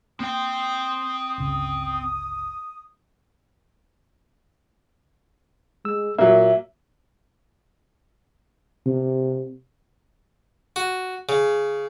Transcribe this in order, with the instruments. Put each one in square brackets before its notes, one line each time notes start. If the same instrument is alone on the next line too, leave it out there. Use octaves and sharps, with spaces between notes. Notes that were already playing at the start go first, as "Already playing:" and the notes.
[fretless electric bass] A#3 [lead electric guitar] C4 G5 [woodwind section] D#6
[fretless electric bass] G1 C#2 C#3
[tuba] G#3 [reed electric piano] E6
[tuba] A#2 [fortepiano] F#3 A#3 [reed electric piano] E5
[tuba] C3
[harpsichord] F#4
C#3